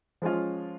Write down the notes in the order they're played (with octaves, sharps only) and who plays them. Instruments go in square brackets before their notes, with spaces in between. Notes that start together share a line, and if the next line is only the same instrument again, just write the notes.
[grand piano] F3 G#3 C#4 F4